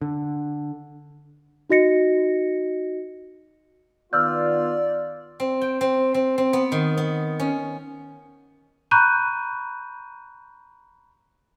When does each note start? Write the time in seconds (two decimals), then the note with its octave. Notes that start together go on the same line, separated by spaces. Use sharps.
0.02 D3
1.70 D#4 F#4 D#5 A#6 C#7
4.13 D#3 B3 F4 D5 E6 F6 G6
5.40 C4
5.61 G5
5.81 C4
6.14 C4
6.38 C4
6.53 B3
6.72 D#3
6.97 B3
7.40 C#4
8.91 A#5 B5 C#6 F#6 G6 D#7